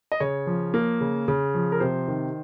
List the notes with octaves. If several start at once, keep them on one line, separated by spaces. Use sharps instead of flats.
D#5
C#3 C#5
F3
A#3
C#3
C#3
F3
A#4
C3 C5
D#3